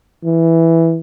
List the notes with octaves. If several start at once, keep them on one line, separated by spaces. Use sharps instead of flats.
E3